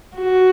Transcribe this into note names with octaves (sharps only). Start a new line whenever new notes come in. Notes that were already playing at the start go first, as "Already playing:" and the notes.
F#4